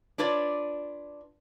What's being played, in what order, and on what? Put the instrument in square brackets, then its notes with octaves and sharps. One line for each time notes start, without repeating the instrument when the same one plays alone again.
[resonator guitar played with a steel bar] D4 F4 B4 C#5 D5